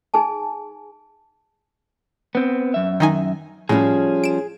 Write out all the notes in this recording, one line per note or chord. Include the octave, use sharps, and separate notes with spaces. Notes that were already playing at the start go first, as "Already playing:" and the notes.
D#4 G#4 G#5 A5
B3 C4
F#2 E5
D#3 D#4 G#5
A2 F3 G3 C#4 G#4
D7 E7